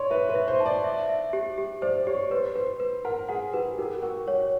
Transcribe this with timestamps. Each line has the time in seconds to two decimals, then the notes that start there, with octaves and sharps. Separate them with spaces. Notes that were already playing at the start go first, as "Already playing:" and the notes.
Already playing: C#5 D5 C6
0.10 B4 E5
0.30 B4
0.35 E5
0.48 C5
0.60 A5
0.66 D5
0.84 E5
1.09 E5
1.33 G4
1.58 G4
1.82 C5 D5
2.07 G4 C#5
2.31 B4 C5
2.56 B4 C5
2.80 B4
3.05 A#4 F#5
3.29 G#4 F#5
3.53 G4 B4
3.78 G4 A#4
4.02 F#4 A#4
4.27 F#4 C#5